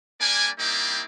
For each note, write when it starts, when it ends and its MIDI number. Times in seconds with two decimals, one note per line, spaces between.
0.20 0.48 55
0.20 0.48 58
0.20 0.48 62
0.20 0.48 74
0.20 0.48 80
0.58 1.03 55
0.58 1.03 58
0.58 1.03 60
0.58 1.03 63
0.58 1.03 64
0.58 1.03 74